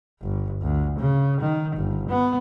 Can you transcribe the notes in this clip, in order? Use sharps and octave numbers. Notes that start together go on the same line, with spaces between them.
G1
D2
C#3
D#3
G1
B3